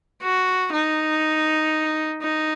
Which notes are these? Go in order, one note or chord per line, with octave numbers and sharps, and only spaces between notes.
F#4
D#4
D#4